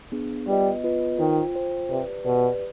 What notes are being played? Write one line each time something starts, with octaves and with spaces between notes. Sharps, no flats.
B3 D4 G#4
G3 B3 F4 B4 D#5
B3 F4 B4 D#5
D#3 F4 C5 G5
F4 C5 G5
C3 G4 B4 D5
B2 G4 B4 D5